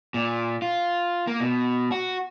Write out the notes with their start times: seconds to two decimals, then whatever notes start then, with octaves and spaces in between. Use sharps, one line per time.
0.14 A#2
0.62 F4
1.27 A#3
1.40 B2
1.92 F#4